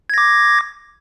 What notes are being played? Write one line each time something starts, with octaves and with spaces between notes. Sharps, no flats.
D6 G#6 A#6